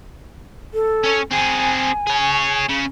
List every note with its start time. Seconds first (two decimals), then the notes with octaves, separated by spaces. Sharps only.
0.74 A4
1.04 C#4 C#5
1.31 C4 G#4 G#5
2.07 G#4 C#5
2.69 C#3 C#4